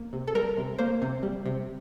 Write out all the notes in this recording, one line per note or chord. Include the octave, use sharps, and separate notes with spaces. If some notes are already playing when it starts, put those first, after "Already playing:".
Already playing: A#3
C3
A4
G3 A#4
C3
A#3 C5
C3
G3
C3